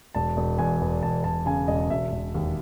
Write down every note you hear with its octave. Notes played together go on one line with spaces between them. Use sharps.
E1 A5
E1
E2 G#5
E2
E1 A5
E1 A5
C#3 G#5
E1 D#5
E1 E5
E1
D#2